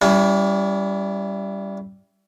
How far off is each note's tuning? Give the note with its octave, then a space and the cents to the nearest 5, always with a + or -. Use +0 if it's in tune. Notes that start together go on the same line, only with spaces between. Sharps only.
G3 +0 C#4 +40 E4 +25